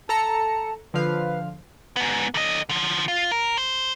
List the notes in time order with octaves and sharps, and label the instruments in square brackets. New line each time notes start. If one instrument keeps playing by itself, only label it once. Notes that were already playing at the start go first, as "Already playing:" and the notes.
[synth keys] A4 A#5 C#7 [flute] A5
[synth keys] D3 F3 F5 [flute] B4
[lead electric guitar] G#2 B3
D3 D#5
D3 F3
F4
A#4
C5